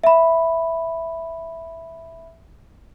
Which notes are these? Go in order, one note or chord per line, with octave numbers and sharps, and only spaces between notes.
E5 B5